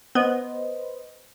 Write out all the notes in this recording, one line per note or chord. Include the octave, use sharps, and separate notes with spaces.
B3 B4 C5 D#5